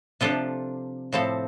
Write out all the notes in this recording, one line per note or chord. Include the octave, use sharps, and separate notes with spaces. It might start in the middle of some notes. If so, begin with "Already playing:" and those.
C3 F3 D4 F4 A4
A2 F3 C4 A4